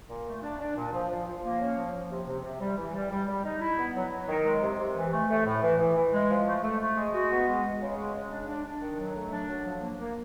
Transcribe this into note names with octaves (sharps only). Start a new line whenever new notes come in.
A#2
A3
D4
D4
A#2
F3
F3
F3
A#3
C#4
F3
F3
C3
C3
C3
G3
E3
G3
G3
G3
D#4
E4
B3
F#3
F#3
D#3
G#3
C3
C3
E3
A3
A3
A2
E3
E3
E3
G#3
F3
A3
A3
A3
G#3
F#4
B3
G#3
G#3
C#3
G#3
C#3
D4
D4
D4
D#3
F#3
A3
D4
F#3
F3
A#3
A#3